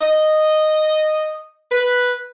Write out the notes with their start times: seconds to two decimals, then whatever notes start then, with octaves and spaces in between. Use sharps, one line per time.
0.01 D#5
1.72 B4